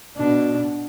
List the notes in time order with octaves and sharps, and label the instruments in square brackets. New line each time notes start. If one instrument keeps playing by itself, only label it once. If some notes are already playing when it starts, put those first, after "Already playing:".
[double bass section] B2 [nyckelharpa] D4